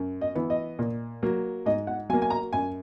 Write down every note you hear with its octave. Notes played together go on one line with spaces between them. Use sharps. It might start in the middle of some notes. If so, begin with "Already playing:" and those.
Already playing: F#2
D#5
E3 B3
D#5
A#2
F#3 A#3
G#2 D#5
F#5
F#3 A#3 G#5
G#5
A#5
F#2 G#5